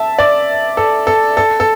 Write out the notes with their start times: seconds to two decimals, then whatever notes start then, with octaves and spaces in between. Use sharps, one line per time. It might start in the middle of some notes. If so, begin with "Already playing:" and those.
Already playing: E5 A5
0.19 D5
0.77 A4
1.07 A4
1.37 A4
1.60 A4